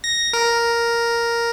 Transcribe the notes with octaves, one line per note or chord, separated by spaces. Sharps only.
A#6
A#4